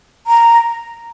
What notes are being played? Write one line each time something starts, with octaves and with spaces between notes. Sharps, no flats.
A#5